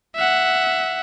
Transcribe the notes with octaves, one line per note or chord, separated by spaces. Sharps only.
E5 F#5